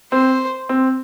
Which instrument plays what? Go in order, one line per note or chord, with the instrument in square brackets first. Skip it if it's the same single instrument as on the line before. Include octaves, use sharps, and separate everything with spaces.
[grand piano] C4 [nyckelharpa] C5
[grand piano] C4